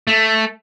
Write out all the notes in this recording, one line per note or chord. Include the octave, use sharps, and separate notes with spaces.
A3